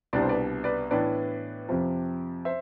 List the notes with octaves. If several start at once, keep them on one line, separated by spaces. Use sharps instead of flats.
C2 B2 G3 B3 D4 D5
C5
B4 D5
B4 D5
A2 E3 B3 D4 B4 D5
F2 C3 F3
C5 E5